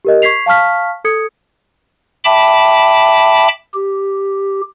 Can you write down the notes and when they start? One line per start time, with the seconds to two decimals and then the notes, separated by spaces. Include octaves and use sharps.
0.05 G4 A#4 D#5
0.22 C#6 G#6 B6 C7 F7
0.46 F5 A5 C#6 F6 B6
1.05 A4 D#6 G#6 C#7
2.24 E5 G5 A5 B5 D6
3.74 G4